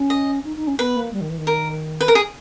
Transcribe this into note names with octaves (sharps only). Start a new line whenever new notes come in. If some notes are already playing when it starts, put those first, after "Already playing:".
Already playing: C#4
D#5
D#4
D#4
C#4
B3 B4
A#3
G3
D#3
E3
D#3
A#4
B4
A#4
G#4